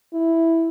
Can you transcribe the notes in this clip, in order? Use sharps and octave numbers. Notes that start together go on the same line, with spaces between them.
E4